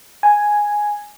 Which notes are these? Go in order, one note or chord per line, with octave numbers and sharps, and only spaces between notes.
G#5